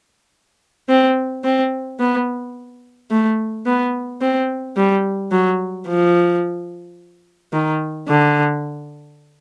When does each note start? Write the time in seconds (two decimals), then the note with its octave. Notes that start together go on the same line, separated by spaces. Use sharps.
0.89 C4
1.44 C4
1.99 B3
3.11 A3
3.66 B3
4.21 C4
4.77 G3
5.32 F#3
5.87 F3
7.53 D#3
8.09 D3